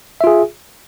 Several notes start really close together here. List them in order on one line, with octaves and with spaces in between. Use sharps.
E5 F4 G#4